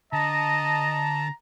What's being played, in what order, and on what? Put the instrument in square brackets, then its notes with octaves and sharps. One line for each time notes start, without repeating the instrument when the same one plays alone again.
[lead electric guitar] D3 [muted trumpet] D#5 [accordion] A5 [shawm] A#5